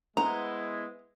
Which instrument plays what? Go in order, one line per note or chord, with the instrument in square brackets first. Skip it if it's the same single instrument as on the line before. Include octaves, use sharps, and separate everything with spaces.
[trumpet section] G#3 E4 [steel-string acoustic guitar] B3 C5 [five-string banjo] A#5